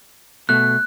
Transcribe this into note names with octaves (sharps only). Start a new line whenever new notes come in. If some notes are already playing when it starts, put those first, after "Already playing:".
B2 A3 F#6